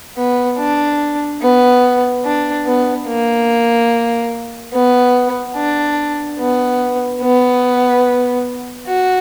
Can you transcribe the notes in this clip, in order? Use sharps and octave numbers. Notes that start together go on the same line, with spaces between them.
B3
D4
B3
D4
B3
A#3
B3
D4
B3
B3
F#4